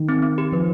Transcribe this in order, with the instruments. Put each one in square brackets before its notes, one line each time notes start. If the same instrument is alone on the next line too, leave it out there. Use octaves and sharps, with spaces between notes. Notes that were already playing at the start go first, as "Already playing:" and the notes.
Already playing: [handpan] D#3
[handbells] C4
C4
G4
[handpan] F3 [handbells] B4